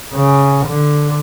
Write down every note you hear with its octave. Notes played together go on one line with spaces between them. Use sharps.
C#3
D3